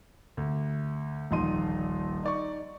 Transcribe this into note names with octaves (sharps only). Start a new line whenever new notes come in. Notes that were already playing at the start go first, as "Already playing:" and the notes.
D2
D#1 A#1 D#4 D#5 C6 D#7
D#4 D5 C#6